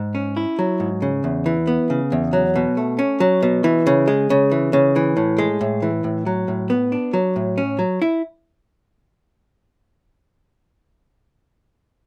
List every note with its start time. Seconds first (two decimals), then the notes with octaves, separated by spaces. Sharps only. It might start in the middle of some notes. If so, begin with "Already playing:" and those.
Already playing: G#2
0.15 C#4
0.37 E4
0.59 F#3
0.80 G#2
1.02 C#3
1.24 E2
1.46 E3
1.67 B3
1.90 C#3
2.12 E2
2.33 F#3
2.56 B2
2.77 A3
2.99 C#4
3.20 F#3
3.42 B2
3.64 E3
3.87 C#3
4.08 G#3
4.30 C#3
4.51 E3
4.73 C#3
4.96 E3
5.17 A2
5.38 G#3
5.61 A2
5.82 E3
6.04 A2
6.26 F#3
6.48 A2
6.70 B3
6.92 D4
7.14 F#3
7.36 A2
7.58 C#4
7.79 F#3
8.02 E4